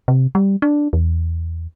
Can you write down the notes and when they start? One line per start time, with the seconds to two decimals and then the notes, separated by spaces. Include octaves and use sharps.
0.08 C3
0.35 G3
0.62 D4
0.93 E2